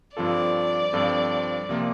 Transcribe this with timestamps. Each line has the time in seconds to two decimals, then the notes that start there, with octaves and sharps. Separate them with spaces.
0.17 G2 F3 C4 F4 A4 D5
0.93 G2 F3 C4 F4 A4
1.69 C3 F3 A#3 F4